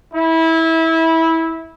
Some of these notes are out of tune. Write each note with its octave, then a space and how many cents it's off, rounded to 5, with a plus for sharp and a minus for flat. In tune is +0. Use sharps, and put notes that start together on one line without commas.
E4 -20